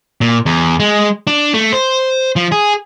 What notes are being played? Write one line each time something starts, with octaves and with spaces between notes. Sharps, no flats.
A#2
E2
G#3
D4
A3
C5
F3
G#4